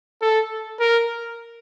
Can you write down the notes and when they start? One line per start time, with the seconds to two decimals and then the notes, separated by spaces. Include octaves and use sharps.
0.22 A4
0.80 A#4